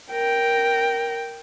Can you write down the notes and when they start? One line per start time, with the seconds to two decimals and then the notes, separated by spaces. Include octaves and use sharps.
0.12 A#4 G5